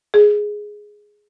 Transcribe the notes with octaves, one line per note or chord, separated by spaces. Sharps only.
G#4